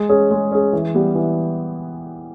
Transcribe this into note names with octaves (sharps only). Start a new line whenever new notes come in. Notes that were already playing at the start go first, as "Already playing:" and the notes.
Already playing: G#3
C#4 G#4
G#3
C#4 G#4
E3
G3 B3 G4
E3